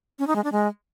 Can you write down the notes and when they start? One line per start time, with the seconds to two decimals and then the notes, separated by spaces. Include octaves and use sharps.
0.19 C#4
0.27 D#4
0.36 G#3
0.44 D4
0.52 G#3